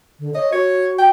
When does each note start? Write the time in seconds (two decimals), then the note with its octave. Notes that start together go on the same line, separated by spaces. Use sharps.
0.20 D3
0.35 C#5 D#5
0.52 F#4 C#5
0.98 G5